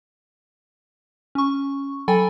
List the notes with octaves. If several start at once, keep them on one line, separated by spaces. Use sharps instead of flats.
C#4 C#6
F#3 A4 G5 G#5 B5 A6